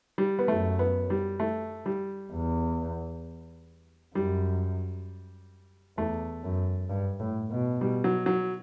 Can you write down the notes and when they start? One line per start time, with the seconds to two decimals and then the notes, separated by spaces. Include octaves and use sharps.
0.18 G3
0.39 B3
0.48 F#2 A3
0.79 B3
1.10 G3
1.40 A3
1.86 G3
2.32 E2
4.15 F#2 G3
5.97 E2 A3
6.43 F#2
6.90 G2
7.20 A2
7.51 B2
7.81 G3
8.04 F#3
8.26 F#3